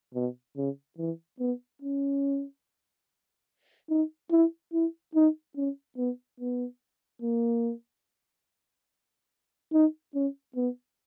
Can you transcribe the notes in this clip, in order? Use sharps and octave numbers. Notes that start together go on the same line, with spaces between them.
B2
C#3
E3
B3
C#4
D#4
E4
E4
D#4
C#4
B3
B3
A#3
D#4
C#4
B3